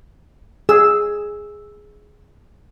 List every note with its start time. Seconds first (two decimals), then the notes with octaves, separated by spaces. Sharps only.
0.69 G#4 E6